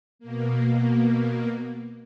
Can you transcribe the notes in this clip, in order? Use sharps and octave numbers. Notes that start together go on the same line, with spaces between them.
B2 A#3